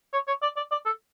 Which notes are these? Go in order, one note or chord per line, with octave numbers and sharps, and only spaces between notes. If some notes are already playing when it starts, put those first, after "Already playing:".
C#5
C#5
D5
D5
D5
A4